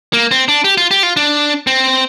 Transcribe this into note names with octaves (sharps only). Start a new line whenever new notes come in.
A#3
C4
D4
G4
F4
G4
F4
D4
C4